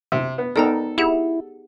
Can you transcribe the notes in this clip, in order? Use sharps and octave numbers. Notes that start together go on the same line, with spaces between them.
C3
B3
B3 D#4 A4 A#4 D5 G5 A#5
E4 G4 G#4 F#5